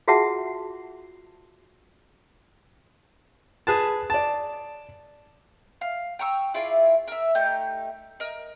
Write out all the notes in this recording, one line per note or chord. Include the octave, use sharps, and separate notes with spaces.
F4 F#4 G#4 E5 F#5 A5
G#4 B4 A5
D5 A5
F5
G5 A#5 C#6 E6
E4 F4 G#4 D5
A#4 E5
A3 D#4 G4 G6
A#4 D#5